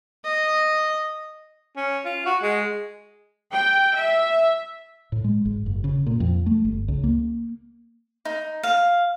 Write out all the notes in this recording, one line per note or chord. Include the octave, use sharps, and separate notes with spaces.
D#5
C#4
F4
F#4
G#3
G5
E5
A2
G#3
G#1
F#1
C#3
A#2
F2
A3
G1
C#2
A#3
D#4
F5